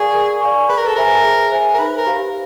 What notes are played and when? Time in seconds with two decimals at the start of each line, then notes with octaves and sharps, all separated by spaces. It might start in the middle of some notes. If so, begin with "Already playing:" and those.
Already playing: G#4 A#4 D5 F5 G#5 C#6
0.14 A#4
0.41 D5 F5 G#5 C#6
0.68 G#4 B4
0.78 A#4
0.87 A4
0.95 A#4 C5 E5 G#5
1.24 G#4
1.52 C5 E5 G#5
1.74 A#4
1.78 D#4 B4
1.97 A#4
2.06 G4 C5 F5